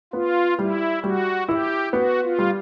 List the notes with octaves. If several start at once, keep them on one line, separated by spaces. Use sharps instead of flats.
B3 F4
G3 E4
G3 F#4
E4 G4
B3 F#4
F4
G3